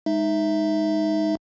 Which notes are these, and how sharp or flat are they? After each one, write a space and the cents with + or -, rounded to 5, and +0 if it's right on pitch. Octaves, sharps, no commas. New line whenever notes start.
G#3 -10 D#4 +0 E5 +0